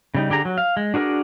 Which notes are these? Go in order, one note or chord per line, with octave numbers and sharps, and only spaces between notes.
C#3 G3 D#4
D3 G4 G#4 A#5
F#3
F5
G#3
D4 F#4 G#4 A#4 D5